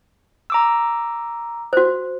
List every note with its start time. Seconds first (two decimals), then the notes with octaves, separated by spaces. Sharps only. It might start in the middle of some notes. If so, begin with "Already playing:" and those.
0.50 A#5 D6 E6
1.73 F#4 C5